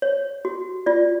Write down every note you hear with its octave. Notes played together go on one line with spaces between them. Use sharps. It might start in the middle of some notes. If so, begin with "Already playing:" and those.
C#5
F#4
F4 D5